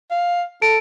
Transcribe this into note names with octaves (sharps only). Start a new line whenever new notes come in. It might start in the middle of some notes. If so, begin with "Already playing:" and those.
F5
A4 D7